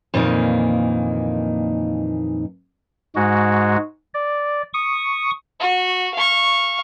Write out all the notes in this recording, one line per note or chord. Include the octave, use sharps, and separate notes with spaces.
F2 A#2 D#3 E3 A#3 D#4
G#2 G#3 F#4
D5
C#6 D#6
F#4
F5 C#6